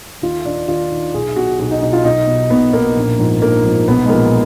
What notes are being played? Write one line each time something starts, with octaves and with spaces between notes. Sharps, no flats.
D#2 F4
D#3 D4
D#2 F4
D#3
B1 G#4
B2 F#4
B1 F#4
D#4
B2 D#4
F4
B1 D#4
B2
B1 B3
B2 A#3
A#1
G#2 F3
A#1 A#3
G#2 F3
B1 B3
G#3
A#2 F3 A#3